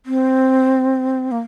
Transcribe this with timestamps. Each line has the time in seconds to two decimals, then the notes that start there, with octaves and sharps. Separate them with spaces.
0.06 C4
1.31 A#3